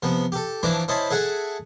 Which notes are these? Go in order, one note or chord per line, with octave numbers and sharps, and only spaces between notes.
C3 F3 B3
G4 A4
E3 F3 D4 E4 A#5 D6
C#4 E4 C5 D#5 A5 B5
G#4 A4 E5 F#5 G#5